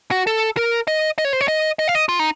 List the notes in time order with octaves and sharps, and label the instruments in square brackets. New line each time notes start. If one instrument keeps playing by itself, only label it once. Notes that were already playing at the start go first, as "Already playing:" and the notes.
[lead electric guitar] F#4
A4
A#4
D#5
D#5
C#5
C5
C#5
D#5
D#5
F5
D#5
F4
D#4